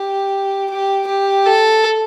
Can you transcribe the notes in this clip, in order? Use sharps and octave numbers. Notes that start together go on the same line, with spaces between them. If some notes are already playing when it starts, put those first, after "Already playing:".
Already playing: G4
G4
G4
A4